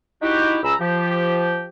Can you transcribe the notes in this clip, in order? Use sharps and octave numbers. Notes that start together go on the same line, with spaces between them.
D#4 E4 F#4 G4
C#2 G#4 A#5 B5 E6
F3 G4